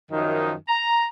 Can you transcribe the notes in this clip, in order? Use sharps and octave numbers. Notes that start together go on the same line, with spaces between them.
F#2 D#3 F3 D#4
A#5